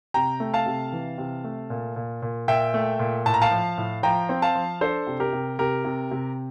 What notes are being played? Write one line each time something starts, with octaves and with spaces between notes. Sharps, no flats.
C3 G5 A#5
A3
F5 A5
C3
E3
C3
A3
A#2
A#2
A#2
A#2 E5 G5
A3
A#2
A2 A5
A#5
F5 A5
F3
A2
F3 G5 A#5
C4
F5 A5
F3
D4 A4 C5
C3
G4 A#4
C3
C3 G4 A#4
C3
C3